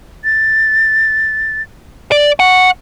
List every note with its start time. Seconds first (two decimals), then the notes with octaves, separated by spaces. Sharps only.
0.24 A6
2.12 D5
2.40 F#5 C#6